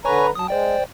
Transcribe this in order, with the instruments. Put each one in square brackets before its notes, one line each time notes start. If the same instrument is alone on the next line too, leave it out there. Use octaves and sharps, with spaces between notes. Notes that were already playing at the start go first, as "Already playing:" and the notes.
[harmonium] D3 B4 A#5 [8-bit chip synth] C#5 G#5 C#6
[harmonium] F#3 [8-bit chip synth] A5 D#6
[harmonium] G#3 [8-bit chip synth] C5 D5 G5